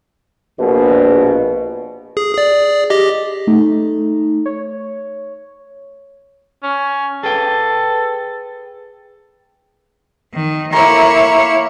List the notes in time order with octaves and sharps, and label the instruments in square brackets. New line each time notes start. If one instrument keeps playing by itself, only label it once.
[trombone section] A#1 B2
[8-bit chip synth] G#4
G#4 D5
G4 D#5
[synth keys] A3 D#4
C#5
[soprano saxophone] C#4
[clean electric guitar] G#4 B4 G5 [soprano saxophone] A4
[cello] D#3
[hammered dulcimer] A#3 A#5 C6 [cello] E4 C#5